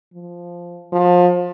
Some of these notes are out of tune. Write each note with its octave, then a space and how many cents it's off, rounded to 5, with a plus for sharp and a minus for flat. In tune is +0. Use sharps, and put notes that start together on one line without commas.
F3 -5
F3 +30